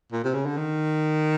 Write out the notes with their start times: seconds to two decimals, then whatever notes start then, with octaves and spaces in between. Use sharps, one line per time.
0.13 A#2
0.24 C3
0.34 C#3
0.46 D3
0.57 D#3